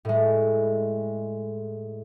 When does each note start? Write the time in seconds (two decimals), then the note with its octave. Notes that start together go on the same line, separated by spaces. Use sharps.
0.05 A2 G#3